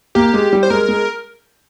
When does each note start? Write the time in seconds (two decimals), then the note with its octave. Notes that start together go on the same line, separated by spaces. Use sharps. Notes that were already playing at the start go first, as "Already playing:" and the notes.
0.15 A#3 G4
0.34 G#3
0.53 G3
0.63 C5
0.70 G#3 A#4
0.88 G#3